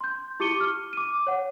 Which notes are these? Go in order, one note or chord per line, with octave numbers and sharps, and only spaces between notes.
C6 G6
E4 G4 D6 C#7 D#7 G7
F6
D6 D#7
C#5 F#5